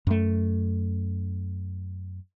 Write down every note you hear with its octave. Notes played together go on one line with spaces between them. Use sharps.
F#2 A3